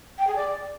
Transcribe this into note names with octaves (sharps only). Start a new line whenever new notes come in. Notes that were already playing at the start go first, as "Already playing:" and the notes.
G5
G#4
D5